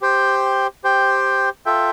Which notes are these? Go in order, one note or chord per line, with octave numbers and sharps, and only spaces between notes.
G4 C5 G5
G4 C5 G5
F4 A4 E5 G5